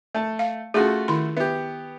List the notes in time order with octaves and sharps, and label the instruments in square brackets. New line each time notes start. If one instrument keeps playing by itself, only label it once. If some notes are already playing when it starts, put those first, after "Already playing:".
[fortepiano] A3 A5
[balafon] F5
[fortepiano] A3 F4 F#4 [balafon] C#4 G#4
[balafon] D#3 E4 C6
[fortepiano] B3 G4 [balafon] E5